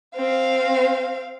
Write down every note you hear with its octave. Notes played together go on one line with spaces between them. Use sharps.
C4 F5